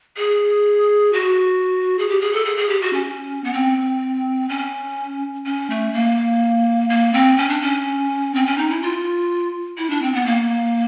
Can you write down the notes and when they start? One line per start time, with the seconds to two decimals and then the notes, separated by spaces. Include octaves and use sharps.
0.17 G#4
1.13 F#4
1.99 G#4
2.09 G4
2.21 G#4
2.33 A4
2.45 G#4
2.57 G#4
2.69 G4
2.82 F#4
2.93 C#4
3.44 B3
3.54 C4
4.49 C#4
5.46 C#4
5.70 A3
5.93 A#3
6.90 A#3
7.13 C4
7.38 C#4
7.49 D4
7.62 C#4
8.35 C4
8.46 C#4
8.58 D#4
8.70 E4
8.82 F4
9.78 E4
9.90 D4
10.02 C4
10.14 B3
10.26 A#3